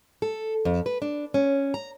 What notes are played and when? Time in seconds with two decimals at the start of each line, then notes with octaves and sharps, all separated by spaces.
0.22 A4
0.65 F2
0.86 B4
1.02 D4
1.34 C#4
1.74 A#5